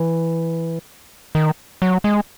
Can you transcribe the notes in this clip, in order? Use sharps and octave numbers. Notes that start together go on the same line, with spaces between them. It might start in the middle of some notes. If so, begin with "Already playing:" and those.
Already playing: E3
D#3
F#3
G#3